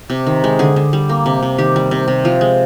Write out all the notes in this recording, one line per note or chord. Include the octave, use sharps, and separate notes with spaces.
C3
D#3
G#3
D3 G#4
D3
G3
A#3
C3
C3
D#3 G4
G3
C3
C3
F3 F4
G#3